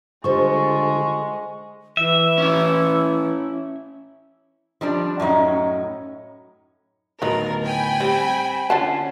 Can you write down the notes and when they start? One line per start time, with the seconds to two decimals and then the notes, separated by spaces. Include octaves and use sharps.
0.24 D3 G3 G#3 F4 A4 C5 C#6
1.97 E3 E5
2.38 C#4 E4
4.81 F3 G3 D4
5.20 F#2 A2 C#4 D#4
7.22 D2 A2 D#3 F#3 B3 A#4
7.64 G5 G#5 B5
8.01 G3 C4
8.70 D3 C#4 F4 D5 F#5 A5